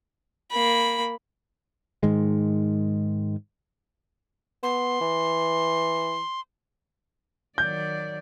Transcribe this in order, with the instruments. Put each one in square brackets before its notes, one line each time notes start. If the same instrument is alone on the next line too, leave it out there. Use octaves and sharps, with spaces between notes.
[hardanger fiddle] A#3 B5
[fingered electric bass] G#2 D#3 G#3
[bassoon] B3 [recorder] C6
[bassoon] E3
[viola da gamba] D#3 F#3 D5 [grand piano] G6